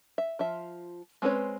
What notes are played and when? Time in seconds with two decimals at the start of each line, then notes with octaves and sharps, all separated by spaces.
0.18 E5
0.39 F3 F4 E5
1.22 G#3 C4 C#4 B4 C#5